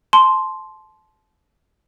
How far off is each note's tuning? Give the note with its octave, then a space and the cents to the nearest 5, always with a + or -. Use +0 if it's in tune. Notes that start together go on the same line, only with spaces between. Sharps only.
A5 -25 C6 +0